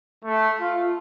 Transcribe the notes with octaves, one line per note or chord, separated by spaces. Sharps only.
A3
F4